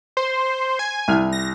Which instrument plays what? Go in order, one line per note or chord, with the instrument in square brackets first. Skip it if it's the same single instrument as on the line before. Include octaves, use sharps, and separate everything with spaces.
[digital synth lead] C5
G#5
[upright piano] C2 F6 F7
[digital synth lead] A#6